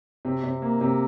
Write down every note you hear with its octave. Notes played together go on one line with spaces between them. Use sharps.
C3
C3
A#3
C3